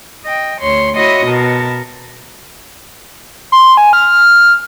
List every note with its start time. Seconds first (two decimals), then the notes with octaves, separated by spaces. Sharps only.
0.25 D#5 G5
0.60 D2 C#5 C6
0.94 E4 F#4 C#5 D#5 C6 D#6
1.26 B2 A#4 A5
3.52 C6
3.77 G#5
3.93 F6